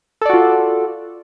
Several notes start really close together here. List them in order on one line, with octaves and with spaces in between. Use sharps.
A4 D5 F#4 F4